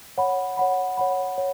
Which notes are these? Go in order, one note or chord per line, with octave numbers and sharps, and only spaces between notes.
C#5 F#5 B5
C#5 F#5 B5
C#5 F#5 B5
C#5